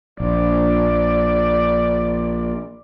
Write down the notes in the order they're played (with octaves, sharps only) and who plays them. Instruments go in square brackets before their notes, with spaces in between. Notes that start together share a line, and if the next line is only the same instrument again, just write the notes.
[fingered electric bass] A#1 [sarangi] D5